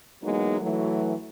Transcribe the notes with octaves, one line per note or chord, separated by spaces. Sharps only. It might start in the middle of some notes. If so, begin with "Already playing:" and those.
E3 F#3 G#3 A#3 B3 D#4
E3 F#3 A3